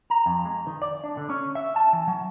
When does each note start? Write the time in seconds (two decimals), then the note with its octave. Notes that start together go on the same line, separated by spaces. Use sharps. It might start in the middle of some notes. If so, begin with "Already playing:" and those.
0.10 A#5
0.26 F2
0.45 G#3
0.67 D#3
0.82 D5
1.04 D4
1.17 D3
1.30 C#4
1.55 E5
1.76 A5
1.93 E3
2.08 F#3